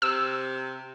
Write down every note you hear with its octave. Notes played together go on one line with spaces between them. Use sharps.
C3 E6